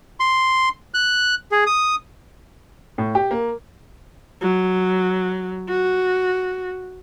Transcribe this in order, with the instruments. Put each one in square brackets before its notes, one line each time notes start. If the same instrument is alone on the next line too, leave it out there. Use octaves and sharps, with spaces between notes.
[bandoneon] C6
F#6
G#4
D#6
[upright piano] A2
G4
A#3
[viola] F#3
F#4